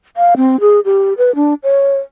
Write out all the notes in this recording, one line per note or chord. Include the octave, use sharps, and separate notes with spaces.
F5
C4
G#4
G4
B4
D4
C#5